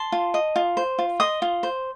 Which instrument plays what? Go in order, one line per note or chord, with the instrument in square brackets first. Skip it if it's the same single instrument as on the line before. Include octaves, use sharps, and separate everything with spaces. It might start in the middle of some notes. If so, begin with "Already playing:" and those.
Already playing: [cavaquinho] A5 C6
F4
D#5
F4
C5
F4
D#5 C6 D#6
F4
C5